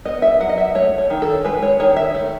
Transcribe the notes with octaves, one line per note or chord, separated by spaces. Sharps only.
B3 D#5
E5
F#3 F#5
D#5
E5
A3 C#5
C#5
D#3
A4
G#3 B4
C#5
D#3 C#5
E5
A3